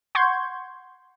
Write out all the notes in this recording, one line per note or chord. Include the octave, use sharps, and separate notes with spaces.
F#5 C6 C#6 G6 G#6